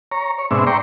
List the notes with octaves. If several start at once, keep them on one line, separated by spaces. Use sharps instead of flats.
C#5 A#5
C#5
G#2 B2 C4 D4 E5
D5 G5 A#5 C6 C#6